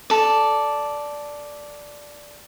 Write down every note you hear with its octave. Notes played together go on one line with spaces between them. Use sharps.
A4 D5